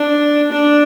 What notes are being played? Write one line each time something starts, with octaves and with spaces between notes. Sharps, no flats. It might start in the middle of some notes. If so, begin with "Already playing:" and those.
Already playing: D4
D4